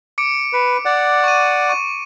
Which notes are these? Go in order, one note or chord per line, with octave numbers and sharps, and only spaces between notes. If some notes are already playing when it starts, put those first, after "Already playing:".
D6 C#7 D7
B4
D5 F#5
C#6 D#7
C#6 D#7